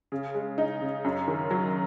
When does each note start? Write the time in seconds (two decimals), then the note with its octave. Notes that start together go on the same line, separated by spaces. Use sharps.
0.12 C#3
0.35 G#3
0.58 D#4
0.81 C#3
1.04 F#2
1.28 D#3
1.51 F#3